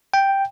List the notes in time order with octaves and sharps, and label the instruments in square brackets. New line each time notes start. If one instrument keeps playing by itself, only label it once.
[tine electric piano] G5